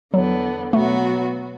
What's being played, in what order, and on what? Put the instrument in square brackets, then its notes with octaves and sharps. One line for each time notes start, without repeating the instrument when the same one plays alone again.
[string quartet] E2 D3 B3 [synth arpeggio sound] F#3
[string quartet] B2 F#3 B3 F#4 [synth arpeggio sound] A3